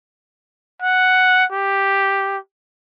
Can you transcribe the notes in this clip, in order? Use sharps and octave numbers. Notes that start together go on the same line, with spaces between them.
F#5
G4